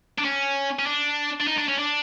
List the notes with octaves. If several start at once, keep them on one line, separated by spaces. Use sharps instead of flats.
D4
C#4
C#4
D4
D4
D#4
D4
C#4
D4